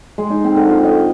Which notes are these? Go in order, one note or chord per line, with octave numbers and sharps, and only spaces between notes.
G#3
D#4
C4
D3
F4
D#5